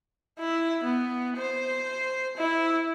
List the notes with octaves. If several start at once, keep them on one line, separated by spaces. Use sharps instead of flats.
E4
B3
C5
E4